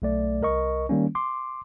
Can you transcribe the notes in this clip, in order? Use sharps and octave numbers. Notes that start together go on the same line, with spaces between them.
B1 A3 D5
C2 A#4 D#5 C#6
D#3 G3 A#3 C#4
C6 D6